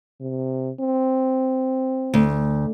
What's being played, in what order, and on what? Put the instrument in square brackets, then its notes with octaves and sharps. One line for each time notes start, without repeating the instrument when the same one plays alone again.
[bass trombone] C3
C4
[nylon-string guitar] D2